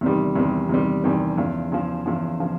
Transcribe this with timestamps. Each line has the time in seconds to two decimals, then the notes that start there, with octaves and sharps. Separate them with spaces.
0.01 E2 C3 D#3 G3
0.35 E2 C3 D#3 G3
0.69 E2 C3 D#3 G3
1.04 E2 C3 D#3 G3
1.37 E2 C#3 F3
1.72 E2 C#3 F3
2.06 E2 C#3 F3
2.40 C#3 F3